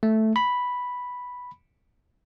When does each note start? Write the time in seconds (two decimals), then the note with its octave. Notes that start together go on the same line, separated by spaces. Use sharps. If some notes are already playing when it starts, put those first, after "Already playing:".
0.03 A3
0.36 B5